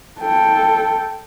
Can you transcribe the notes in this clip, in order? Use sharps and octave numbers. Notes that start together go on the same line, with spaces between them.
A4 G5